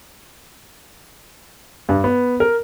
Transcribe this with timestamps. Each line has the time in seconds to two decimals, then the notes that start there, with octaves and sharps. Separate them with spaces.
1.89 G2
2.04 B3
2.40 A#4